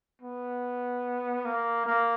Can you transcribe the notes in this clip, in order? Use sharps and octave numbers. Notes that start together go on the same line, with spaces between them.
B3
A#3
A#3